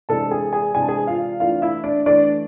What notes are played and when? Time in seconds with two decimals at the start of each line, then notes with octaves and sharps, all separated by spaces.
0.09 C3 E3 G#3 D4 A4 A5
0.31 G#4 G#5
0.53 G#4 G#5
0.75 C3 E3 G#3 D4 G#5
0.82 A5
0.88 G#4 G#5
1.07 F4 F5
1.40 E3 A3 D4 F4 F5
1.62 E4 E5
1.84 D4 D5
2.06 E3 A3 D4 D5